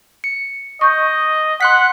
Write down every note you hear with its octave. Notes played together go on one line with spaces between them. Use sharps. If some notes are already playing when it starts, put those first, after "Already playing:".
C#7
D#5 C#6 G6
F#5 C6 F#6 B6